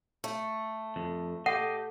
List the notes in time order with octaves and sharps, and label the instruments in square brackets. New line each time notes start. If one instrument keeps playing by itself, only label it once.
[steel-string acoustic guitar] A3
[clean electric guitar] F2
[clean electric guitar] G4 D#5 [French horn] A4 [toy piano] F#5